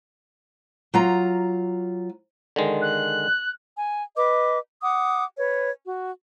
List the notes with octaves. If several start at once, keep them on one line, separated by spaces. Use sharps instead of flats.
F#3 F4 A#5
D3 D#3 G#3
F#6
G#5
B4 D#5 D6
F#5 D6 D#6
B4 C#5
F#4